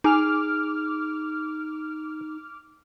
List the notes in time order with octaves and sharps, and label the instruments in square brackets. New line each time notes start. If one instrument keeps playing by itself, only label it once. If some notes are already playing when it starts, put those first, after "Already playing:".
[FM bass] D#4 [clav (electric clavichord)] G#4 [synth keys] D6 F6